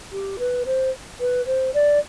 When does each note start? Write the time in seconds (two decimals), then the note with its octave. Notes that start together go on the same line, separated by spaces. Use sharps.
0.12 G4
0.39 B4
0.65 C5
1.20 B4
1.46 C5
1.74 D5